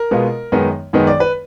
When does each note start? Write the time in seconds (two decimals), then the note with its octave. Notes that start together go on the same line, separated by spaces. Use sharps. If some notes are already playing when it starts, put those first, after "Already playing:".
Already playing: A#4
0.11 B2 G#3 B3 F4
0.52 F#2 D#3 G#3 B3 D#4
0.93 F#2 D#3 G#3 B3 D#4
1.07 D5
1.20 B4